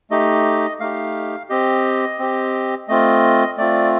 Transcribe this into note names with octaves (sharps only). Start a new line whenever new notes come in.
A3 D#4 G4 D#5
A3 D#4 G4 F5
C4 G4 D#5
C4 G4
A3 C4 F4 D#5
A3 C4 F4 D5